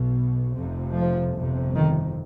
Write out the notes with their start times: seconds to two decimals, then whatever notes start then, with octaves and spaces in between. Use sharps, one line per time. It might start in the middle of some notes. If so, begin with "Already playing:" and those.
Already playing: B1 B2
0.56 F1 F2 C3
0.95 F3
1.34 G1 F2 C3
1.74 D#3